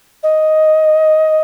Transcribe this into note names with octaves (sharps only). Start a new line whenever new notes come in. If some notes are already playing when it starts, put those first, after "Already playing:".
D#5